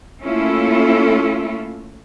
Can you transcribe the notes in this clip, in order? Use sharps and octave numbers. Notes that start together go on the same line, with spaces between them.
A3 A#3 C#4 E4 F4 A4